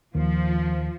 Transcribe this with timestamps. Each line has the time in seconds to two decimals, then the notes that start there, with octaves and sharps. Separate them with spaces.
0.15 D#2 D#3 F3